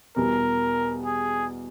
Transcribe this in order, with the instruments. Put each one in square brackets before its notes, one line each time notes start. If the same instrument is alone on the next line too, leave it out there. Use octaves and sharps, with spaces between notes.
[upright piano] E2 B2 G3 [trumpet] A#4
[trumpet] G#4